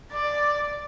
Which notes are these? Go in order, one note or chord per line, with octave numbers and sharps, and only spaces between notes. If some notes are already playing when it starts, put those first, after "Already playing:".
D5